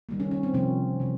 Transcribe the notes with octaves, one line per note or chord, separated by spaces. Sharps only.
D#3 G3 A#3
C#4
C#4
C4
C3 F3 A#3 C#4
C3 E3